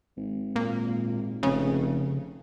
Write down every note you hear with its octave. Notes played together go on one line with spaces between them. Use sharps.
G#1
A#2
F1 C#3